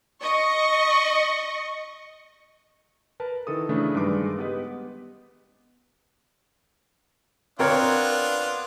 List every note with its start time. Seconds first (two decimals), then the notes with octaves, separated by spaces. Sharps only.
0.22 D#5 C#6
3.20 A#4 B4 A5
3.47 D#3 E3 A4 D#6
3.69 C#3 E3 A3 D4
3.95 G2 D#3 G#3 B4 C6 D6
4.39 B3 G4 B4 D#5
7.59 B3 C4 D4 F4 A#4 C#5